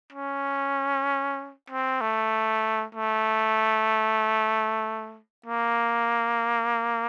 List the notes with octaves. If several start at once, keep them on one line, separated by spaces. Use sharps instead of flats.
C#4
C4
A3
A3
A#3